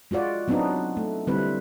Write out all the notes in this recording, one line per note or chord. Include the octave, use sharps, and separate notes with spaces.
G#3 F4 F#4 D5
F#3 B3 C4 D4 D#4 F#4
A3
D3 G3 C4 E4 B4